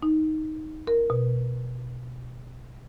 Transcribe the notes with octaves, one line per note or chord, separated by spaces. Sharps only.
D#4
A#4
B2